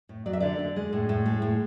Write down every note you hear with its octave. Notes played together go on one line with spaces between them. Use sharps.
A2
F#3 D5
E5
D3 D5
D3
G#3
A2
A2
G#3
A2